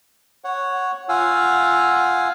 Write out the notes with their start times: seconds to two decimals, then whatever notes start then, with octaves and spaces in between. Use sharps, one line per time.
0.44 C#5 F#5
1.09 F4 F5 F#5 G#5 E6